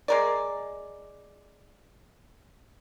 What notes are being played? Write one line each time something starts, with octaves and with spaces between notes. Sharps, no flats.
G#3 A#4 D5